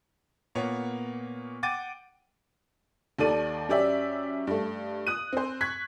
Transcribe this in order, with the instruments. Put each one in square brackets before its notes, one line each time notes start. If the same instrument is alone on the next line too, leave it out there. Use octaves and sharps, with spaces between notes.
[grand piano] A#2 A#3 B3 C#5
F#5 G5 D6 A6 D#7
[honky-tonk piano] D#2 D#3 A4 D5 D#7
F#2 C#4 G4 D5 E5
G2 A3
D#6 F#6 D#7
C4 C5
C#6 F#6 G#6 B6